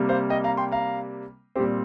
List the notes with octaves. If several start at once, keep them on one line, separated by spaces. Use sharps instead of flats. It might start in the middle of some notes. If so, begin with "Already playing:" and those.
Already playing: C3 G3 A#3
C5 F5
D#5 G5
F5 A#5
G5 C6
F5 A#5
A#2 G3 C4 G4 C5